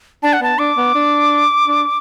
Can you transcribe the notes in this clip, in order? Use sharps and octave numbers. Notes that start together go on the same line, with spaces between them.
D4 A5
F#5
B3 A5
D4 D6
B3
D4
D4